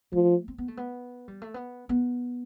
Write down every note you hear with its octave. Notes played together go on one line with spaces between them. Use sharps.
F3 A3
C4
B3
A3
B3
G3
A3
B3
B3